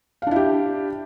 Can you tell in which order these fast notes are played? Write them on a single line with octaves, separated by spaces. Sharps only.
F5 D4 E4 G4